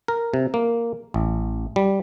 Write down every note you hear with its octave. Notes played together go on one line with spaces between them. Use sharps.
A#4
C3
A#3
A1
G3